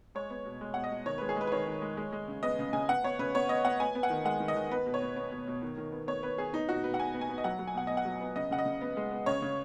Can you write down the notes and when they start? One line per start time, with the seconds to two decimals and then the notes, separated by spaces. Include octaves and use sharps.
0.15 G#3 C#5
0.30 B3
0.46 B2
0.61 G#3
0.74 B2 F#5
0.84 D#5
0.91 B2
1.06 D#3 C#5
1.18 G#3 B4
1.29 G#4
1.36 G#3 B4
1.47 B4
1.52 D#3 C#5
1.67 D#3
1.82 G#3
1.97 G#3
2.12 G#3
2.28 C#3
2.43 B3 D#5
2.59 C#3
2.73 C#3 G#5
2.89 B3 F#5
3.04 B3 C#5
3.19 C#3 B4
3.35 B3 C#5
3.49 B3 D#5
3.65 B3 F#5
3.80 B3 G#5
3.95 B3
4.03 F#5
4.10 D#3
4.25 G#3 F#5
4.40 D#3
4.48 D#5
4.55 D#3
4.71 B3 B4
4.86 B2
4.94 C#5
5.02 B3
5.16 B3
5.31 B2
5.48 B2
5.62 D#3
5.77 D#3
5.92 B3
6.07 B3 C#5
6.23 B3 B4
6.38 B3 G#4
6.53 B3 D#4
6.69 B2 F#4
6.84 B2 B4
6.94 F#5
6.99 B2 G#5
7.14 B3
7.21 G#5
7.29 B3
7.38 D#5
7.44 F#3 F#5
7.59 F#3
7.67 G#5
7.74 B2 F#5
7.87 B3 D#5
7.97 F#5
8.05 F#3
8.21 B3
8.36 C#3 D#5
8.51 C#3 F#5
8.58 D#5
8.66 C#3
8.81 B3
8.97 G#3
9.11 B3
9.26 C#3 C#5
9.42 C#3